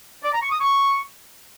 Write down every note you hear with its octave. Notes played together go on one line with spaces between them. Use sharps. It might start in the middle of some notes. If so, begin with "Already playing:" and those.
D5
A#5
C#6
D#6
C#6